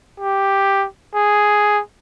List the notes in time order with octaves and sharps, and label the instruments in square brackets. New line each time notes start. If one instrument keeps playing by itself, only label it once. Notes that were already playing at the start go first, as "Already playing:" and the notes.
[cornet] G4
G#4